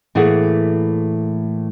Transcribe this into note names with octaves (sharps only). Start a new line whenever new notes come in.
A2 E3 A3 A#3 G#4 F#5